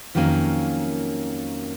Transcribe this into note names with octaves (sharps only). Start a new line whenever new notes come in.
F2 D#3 F#3 A#3 C#4